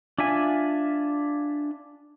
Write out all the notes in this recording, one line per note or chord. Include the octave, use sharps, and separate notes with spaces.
D4 F4 E5 G#5